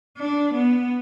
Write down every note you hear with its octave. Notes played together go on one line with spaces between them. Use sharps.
D4
B3